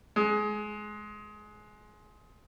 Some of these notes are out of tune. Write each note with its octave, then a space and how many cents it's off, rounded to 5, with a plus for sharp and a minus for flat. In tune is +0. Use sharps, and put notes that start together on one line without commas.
G#3 +20